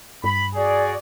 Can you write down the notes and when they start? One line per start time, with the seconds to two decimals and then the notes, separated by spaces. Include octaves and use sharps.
0.24 G2 B5
0.55 F#4 G#4 D5